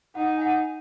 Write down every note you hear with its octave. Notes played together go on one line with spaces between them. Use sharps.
D#4 F#5
G#5
F#5